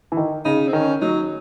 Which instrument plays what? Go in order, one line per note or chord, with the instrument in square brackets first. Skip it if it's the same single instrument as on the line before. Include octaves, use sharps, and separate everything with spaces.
[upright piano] E3
D#3
[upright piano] C#3 [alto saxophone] D#4
[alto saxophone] C4
[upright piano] D#3 [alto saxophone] C#4
[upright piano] F#3 [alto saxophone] D#4